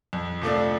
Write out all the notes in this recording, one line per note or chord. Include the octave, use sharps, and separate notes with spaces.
F2
C3 F3 A3 D4